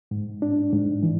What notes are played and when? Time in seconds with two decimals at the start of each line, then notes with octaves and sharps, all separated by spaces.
0.11 G#2
0.42 D4
0.73 G#2
1.03 E3